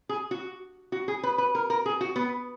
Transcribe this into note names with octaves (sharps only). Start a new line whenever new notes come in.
G#4
F#4
F#4
G#4
B4
B4
A#4
A#4
G#4
F#4
B3